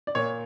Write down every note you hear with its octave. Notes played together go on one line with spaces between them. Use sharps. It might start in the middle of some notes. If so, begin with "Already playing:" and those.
D5
A#2 C#5